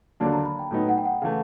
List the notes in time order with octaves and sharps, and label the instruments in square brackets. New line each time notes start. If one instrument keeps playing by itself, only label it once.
[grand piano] D#2 D3 F#3 A#3 D4 [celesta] A5
[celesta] A#5
B5
G5
[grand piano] A2 F#3 B3 D#4
[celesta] F#5
G5
F#5
[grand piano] C#3 E3 A3 [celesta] F5